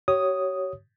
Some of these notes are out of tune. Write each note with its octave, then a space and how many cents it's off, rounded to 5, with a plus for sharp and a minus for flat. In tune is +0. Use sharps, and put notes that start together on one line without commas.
G4 -45 C#5 +0 D#6 +0